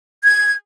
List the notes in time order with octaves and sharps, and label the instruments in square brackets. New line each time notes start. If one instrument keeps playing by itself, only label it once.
[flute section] G#6